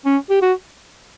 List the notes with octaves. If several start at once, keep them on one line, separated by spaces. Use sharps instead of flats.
C#4
G4
F#4